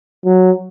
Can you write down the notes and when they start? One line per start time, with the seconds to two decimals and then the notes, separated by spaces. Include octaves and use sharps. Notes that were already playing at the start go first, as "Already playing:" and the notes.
0.25 F#3